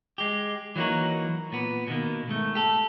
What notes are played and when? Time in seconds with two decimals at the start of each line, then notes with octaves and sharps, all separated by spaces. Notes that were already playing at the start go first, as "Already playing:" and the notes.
0.18 G#3 G4
0.76 E3 F#3 A#3 D#4 F#4
1.52 A#2 B3
1.87 B2 D#3 A#3
2.28 G#2 A3
2.55 G4 A4